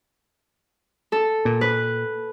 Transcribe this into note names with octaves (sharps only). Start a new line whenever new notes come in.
A4
A#2
B4